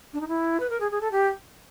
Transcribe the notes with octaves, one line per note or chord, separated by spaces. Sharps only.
D4
D#4
E4
B4
A#4
G#4
G#4
A4
G4